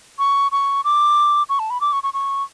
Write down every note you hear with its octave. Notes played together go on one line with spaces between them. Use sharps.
C#6
C#6
D6
C#6
A5
B5
D6
C#6
C#6
C#6